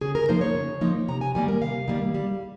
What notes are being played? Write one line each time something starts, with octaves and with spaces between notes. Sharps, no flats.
C#3 G#4
A#4
F3 A#3 D#4 C5
C#5
C#3
F3 A#3 D#4
C3 A#5
G#5
D#3 G3 A#3 G#5
A#4
C3 F5
D#3 G3 A#3
G3